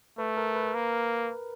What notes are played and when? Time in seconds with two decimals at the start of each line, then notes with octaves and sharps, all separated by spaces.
0.18 A3 B4
0.37 A#4
0.55 B4
0.74 A#3 A#4